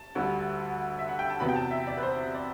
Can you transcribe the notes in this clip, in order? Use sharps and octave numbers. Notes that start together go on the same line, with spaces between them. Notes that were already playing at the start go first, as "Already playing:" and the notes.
Already playing: A5
D2 D3 G3
E5
F#5
G5
A5
E2 C3 F#3 B3 B5
G5
A5
E5
D5
B4
C5
D5